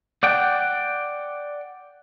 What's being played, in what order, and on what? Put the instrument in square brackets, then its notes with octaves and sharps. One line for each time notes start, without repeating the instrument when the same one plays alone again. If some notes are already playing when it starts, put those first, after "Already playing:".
[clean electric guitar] D5 F#5 G5